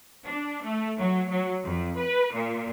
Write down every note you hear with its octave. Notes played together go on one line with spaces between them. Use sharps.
D4
A3
F#3
F#3
F2
B4
A#2